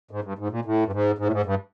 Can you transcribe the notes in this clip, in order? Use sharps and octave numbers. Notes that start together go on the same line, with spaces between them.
G#2
G2
G#2
A#2
A2
G2
G#2
G#2
A2
G#2
G2